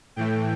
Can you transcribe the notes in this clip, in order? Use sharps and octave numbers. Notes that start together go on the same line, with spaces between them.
A2 E3 A3 G5